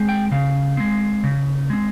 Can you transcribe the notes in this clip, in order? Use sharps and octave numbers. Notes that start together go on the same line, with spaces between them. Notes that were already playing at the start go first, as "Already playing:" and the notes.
Already playing: G#3 C4
G5
C#3 F5
G#3 C4
C#3
G#3 C4